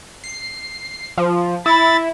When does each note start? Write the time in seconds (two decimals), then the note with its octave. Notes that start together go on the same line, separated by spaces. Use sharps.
0.24 C7
1.18 F3
1.66 E4 B5 A6